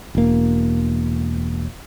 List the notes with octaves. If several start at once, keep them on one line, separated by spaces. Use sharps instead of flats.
E1 A#3